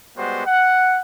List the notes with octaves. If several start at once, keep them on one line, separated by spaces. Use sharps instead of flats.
G3 G#3 B3 F#4 C5
F#5